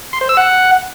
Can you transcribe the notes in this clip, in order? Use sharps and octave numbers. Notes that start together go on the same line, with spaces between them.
C6
C5
E6
F#5